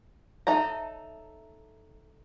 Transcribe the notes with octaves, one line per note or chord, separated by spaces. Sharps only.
D#4 A4 C#5 E5 A5 A#5